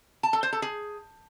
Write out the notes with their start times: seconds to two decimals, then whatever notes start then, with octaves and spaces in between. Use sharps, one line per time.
0.23 A5
0.33 A4
0.43 C5
0.53 A4
0.62 G#4